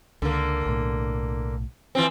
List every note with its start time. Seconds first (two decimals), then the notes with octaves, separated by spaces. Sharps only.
0.22 C#2 D3 A#3
0.66 B1 A2
1.95 E3 F3 C4